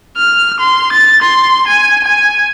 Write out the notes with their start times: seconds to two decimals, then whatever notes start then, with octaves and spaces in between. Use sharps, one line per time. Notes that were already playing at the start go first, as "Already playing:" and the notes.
0.17 F6
0.60 C6
0.93 A6
1.22 C6
1.67 G#5
2.04 G#5